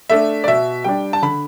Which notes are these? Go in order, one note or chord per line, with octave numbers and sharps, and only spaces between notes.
A3 D4 E5
D5
B2 E5
G3 D4 G5
A5
D3 B5